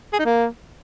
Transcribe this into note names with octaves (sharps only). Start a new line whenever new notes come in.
G#4
D#4
A#3